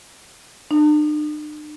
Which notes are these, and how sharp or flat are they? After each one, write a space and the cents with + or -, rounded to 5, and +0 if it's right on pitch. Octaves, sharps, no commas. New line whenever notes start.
D4 +45